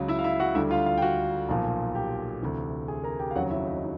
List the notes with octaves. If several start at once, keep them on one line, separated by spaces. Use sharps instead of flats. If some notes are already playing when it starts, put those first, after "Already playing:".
Already playing: C#2 C#3 F#3
E4 E5
F5
E4 E5
F#4 F#5
D2 D3 G3 E4 E5
F4 F5
F4 F5
G5
F#4 F#5
B1 A#2 F3
G4 G5
D2 C3 E3
G#4 G#5
A#4 A#5
G4 G5
F5
F1 D#2 C#3 F#3 F#4 F#5
E4 E5
D#4 D#5
D#4 D#5